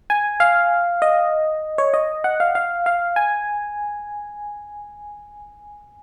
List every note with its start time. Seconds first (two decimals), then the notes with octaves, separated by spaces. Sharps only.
0.10 G#5
0.40 F5
1.02 D#5
1.78 C#5
1.94 D#5
2.24 F#5
2.40 F5
2.55 F5
2.86 F5
3.16 G#5